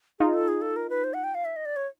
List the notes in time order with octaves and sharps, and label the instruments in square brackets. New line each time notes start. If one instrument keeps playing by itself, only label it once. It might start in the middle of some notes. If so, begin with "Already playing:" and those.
[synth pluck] D#4 F4 [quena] G#4
[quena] A4
G#4
A4
A#4
B4
C5
F#5
G5
F5
E5
D#5
D5
C#5